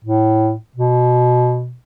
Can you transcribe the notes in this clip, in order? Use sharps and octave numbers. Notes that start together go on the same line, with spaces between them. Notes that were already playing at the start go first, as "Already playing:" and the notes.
A2
B2